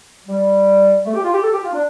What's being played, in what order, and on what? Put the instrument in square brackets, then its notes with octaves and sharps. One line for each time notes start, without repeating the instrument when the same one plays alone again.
[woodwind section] G3
A3
G4
F4
G4
A4
G4
F4
D4